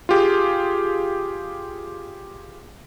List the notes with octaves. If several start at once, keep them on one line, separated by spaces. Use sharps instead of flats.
F4 G4 G#4